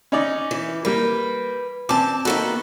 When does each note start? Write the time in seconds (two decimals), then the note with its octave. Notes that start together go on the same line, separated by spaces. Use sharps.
0.12 C#4 D#4 D5
0.51 E3
0.85 G3 A#3 B4
1.89 C4 C#4 A5 D6
2.25 D#3 A#3 B3 F#4 A4